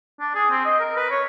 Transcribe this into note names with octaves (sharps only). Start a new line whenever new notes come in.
D4
G#4
C4
D#5
A#4
B4
C#5